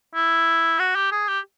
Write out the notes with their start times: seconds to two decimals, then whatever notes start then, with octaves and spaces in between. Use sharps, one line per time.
0.15 E4
0.79 F#4
0.95 G4
1.12 G#4
1.28 G4